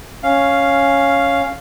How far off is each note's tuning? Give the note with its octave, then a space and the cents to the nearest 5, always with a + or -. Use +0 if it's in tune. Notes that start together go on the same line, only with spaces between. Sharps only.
C#4 +0 F5 +0